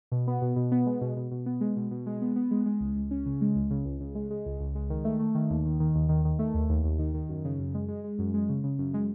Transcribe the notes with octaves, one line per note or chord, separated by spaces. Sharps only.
B2
B3
B2
B2
B3
G#3
B2
B2
B2
B3
G#3
B2
B2
G#3
B3
B3
G#3
G#3
C#2
C#2
C#4
C#3
G#3
C#2
C#3
C#2
C#3
G#3
G#3
C#2
C#2
G#3
D#3
A3
A3
D#3
D#2
D#3
D#3
D#2
D#3
D#3
A3
D#2
D#2
D#2
D#3
D#3
F#2
C#3
F#2
G#3
G#3
G#3
F#2
G#3
C#3
C#3
F#2
G#3